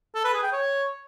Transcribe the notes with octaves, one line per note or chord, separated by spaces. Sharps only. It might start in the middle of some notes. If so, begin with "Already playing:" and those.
A4
B4
G#4
G5
C#5